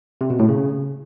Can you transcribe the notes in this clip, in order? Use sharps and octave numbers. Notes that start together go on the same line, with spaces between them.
C3
B2
A2
C#3